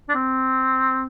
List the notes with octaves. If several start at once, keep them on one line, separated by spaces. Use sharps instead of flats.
D4
C4